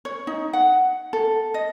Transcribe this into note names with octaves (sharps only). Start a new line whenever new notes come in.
C#5
D#4
F#5
A4
D#5